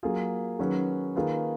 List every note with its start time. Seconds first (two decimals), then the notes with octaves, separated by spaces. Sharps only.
0.03 F#3 A#3 F4 G#4
0.59 D#3 F#3 C#4 G#4 B4
1.15 D#3 A#3 F4 G#4 B4